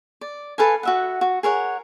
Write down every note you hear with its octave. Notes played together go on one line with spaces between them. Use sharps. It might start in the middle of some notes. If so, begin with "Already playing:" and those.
D5
A4 B4 F5 G#5
F#4 E5 F#5
F#4
G#4 A#4 C#5 F#5